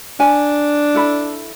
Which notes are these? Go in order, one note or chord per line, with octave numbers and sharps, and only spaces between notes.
D4 G#5
E4 A4 B5